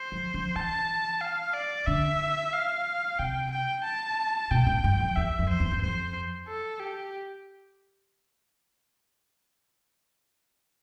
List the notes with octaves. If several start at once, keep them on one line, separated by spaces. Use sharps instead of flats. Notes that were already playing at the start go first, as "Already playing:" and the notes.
Already playing: C5
F3
F3
E3 A5
F5
D5
D3 E5
F5
C3 G5
G5
A5
B2 G5
A2
G2
F2
E2 E5
F2
C5
E2
G2
F2 C5
A4
G4